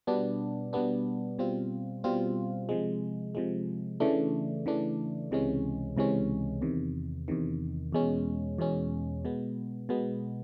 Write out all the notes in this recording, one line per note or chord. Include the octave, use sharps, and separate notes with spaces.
B2 G3 B3 D4
B2 G3 B3 D4
B2 G3 C4 F4
B2 G3 C4 F4
C3 F3 G#3
C3 F3 G#3
C#3 E3 A3 D4
C#3 E3 A3 D4
C#2 C3 E3 G#3 C#4
C#2 C3 E3 G#3 C#4
E2 C3 D#3
E2 C3 D#3
E2 B2 G#3 C#4
E2 B2 G#3 C#4
B2 G#3 B3
B2 G#3 B3